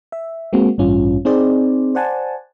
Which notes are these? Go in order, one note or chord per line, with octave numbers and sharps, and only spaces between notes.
E5
G#3 A#3 C4 F#4
A1 G2 C#4 F4
C4 D#4 G#4 C5 D5
C5 D5 F#5 G#5 A5